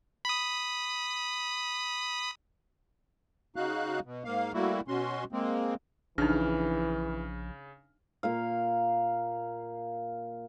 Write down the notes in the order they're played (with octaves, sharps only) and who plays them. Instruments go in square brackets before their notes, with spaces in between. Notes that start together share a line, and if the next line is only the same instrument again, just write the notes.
[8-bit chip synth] B5 D#6
[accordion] C#3 D#4 F#4 F5 F#6
B2
G#2 A#3 F5
G3 A3 A#3 E4 F#4
B2 C#4 F#4 C6
G#3 A#3 C4
[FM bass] A#1 [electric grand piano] C#3 F6 [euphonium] E3 [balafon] D4 D#4
[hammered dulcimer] A#2 A#3 F5